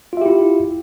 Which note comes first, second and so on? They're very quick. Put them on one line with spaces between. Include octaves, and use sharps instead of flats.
F4 E5 G4 E4